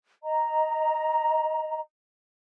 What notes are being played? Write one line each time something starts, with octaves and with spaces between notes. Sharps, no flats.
D#5 A#5